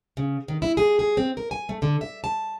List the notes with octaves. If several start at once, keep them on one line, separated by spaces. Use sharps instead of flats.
C#3
D#3
E4
G#4
G#4
C4
A#4
G#5
A3
D3
E5
A5